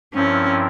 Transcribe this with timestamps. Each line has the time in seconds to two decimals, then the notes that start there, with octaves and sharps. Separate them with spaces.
0.14 G2 F3 C4 C#4 E4 A#4